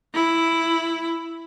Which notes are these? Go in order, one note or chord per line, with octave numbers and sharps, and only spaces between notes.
E4